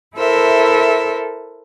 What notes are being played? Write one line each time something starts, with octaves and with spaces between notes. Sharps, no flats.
E4 A4 A#4 C5 E5